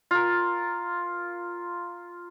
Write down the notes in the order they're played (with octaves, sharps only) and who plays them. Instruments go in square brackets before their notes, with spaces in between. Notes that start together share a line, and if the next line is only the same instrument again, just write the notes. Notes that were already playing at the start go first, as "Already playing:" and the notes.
[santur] F4 A#4